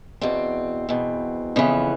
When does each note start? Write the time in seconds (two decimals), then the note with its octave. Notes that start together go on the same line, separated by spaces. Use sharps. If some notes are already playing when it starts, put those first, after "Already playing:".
0.21 E2 B2 C4
0.89 E2 B2
1.56 F2 C#3 E3 B3